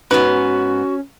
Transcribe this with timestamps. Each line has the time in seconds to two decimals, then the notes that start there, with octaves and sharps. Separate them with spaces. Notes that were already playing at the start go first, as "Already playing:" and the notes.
0.11 G#2 B3 C#4 F#4 B4